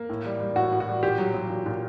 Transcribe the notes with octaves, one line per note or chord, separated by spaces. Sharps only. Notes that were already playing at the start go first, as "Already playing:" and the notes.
Already playing: A#3
A2
G3
G3
A2 F#4
A2
F#4
G3
A#2 G4
F#3
F#3
A#2
A#2